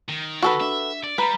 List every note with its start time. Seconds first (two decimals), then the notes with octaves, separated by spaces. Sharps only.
0.09 D#3
0.42 F#4 A4 B4
0.61 D4 E5
1.04 D5
1.18 G3 B4 A#5 B5